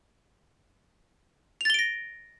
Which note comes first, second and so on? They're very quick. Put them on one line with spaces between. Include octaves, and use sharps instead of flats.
F7 A6 G7 D7 A#6